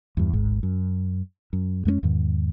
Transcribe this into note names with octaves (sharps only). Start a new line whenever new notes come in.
E2 G2
D1 G#1 G#2
F#2
F#2
F2 G#3 A3 C#4
E2 G#2 D#3